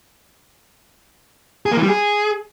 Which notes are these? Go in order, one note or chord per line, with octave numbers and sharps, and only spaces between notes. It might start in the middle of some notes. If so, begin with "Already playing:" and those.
G#4
A#3
E3
G3
G#4